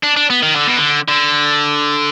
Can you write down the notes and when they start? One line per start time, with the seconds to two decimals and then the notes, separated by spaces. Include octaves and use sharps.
0.04 D4
0.17 D4
0.30 B3
0.43 D#3
0.55 D3
0.67 B2
0.77 D3
1.08 D3